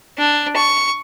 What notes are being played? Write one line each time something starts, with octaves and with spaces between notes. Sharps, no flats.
D4
C#6